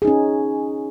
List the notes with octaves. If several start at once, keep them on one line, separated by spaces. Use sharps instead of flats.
C#4 D#4 G#4